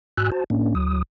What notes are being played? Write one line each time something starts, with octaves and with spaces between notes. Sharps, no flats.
G#2 F#4 G#5 E6 F#6
F#4 C5 A5
A2 A#3 C#4 D4
D2 F#3 D#6